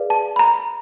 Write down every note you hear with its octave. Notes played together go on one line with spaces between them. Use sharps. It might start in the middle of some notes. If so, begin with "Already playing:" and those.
Already playing: G#4 B4 D5 F5
A5
B5
A#5